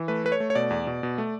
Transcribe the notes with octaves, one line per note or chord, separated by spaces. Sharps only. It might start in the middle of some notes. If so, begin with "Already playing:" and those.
Already playing: E3
A3 B4
A3 B4
C#5
A3
C#5
B2 D5
E2
B2
B2
A3